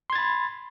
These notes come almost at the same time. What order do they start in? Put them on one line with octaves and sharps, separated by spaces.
C6 G#6 A6 B5